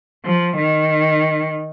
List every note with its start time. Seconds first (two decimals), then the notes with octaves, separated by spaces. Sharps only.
0.25 F3
0.58 D#3